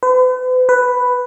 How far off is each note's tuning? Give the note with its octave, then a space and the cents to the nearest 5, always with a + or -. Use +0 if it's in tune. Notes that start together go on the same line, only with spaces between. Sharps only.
B4 +45
B4 +5